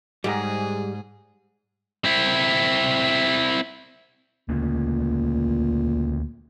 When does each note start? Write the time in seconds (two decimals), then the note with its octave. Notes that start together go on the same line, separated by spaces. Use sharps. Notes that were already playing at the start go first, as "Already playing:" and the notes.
0.24 G#2 G3 G4 G#4 A#5
2.05 C4 E4
4.49 D2 A#2 C#3